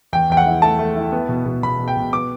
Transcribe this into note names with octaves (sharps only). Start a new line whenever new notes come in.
E2 G5
E2 G5
F#5
E4
A3 A5
A3
E4
B3
B2
B2
B2 B5
B2
G5
B2
B3 D6